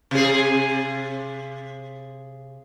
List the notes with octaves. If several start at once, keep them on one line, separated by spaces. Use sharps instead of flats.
C3 G#4